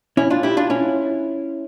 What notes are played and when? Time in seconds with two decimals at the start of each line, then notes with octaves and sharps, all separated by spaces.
0.17 C#4 E4
0.30 D4 F4
0.43 E4 G4
0.57 D4 F4
0.70 C#4 E4